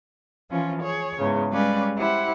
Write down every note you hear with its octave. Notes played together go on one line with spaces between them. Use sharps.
E3 F3 C#4 F4
G#4 C#5
E2 G#2 C#3
G3 G#3 C#4 B4 D5 F5
E4 G4 C5 F#5